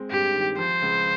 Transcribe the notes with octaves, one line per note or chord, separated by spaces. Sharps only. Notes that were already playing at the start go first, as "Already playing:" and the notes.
Already playing: G#3 C4
G2 G4
D#3
F3 C5
C#2